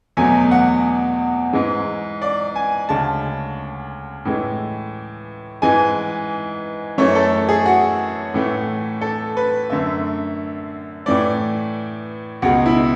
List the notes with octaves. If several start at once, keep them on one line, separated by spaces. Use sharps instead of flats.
E2 B2 F#3 A3 G#5
F#5
G#2 E3 G#3
D5
G#5
D2 C#3 G#3 A5
A2 E3 G#3
G#2 E3 G#3 G#5
F#2 E3 A3 C#5
A4
G#4
F#4
A2 E3 A3
A4
B4
F#2 D3 A3 E5
A2 E3 A3 D5
C#2 B2 G#3 F#4
E4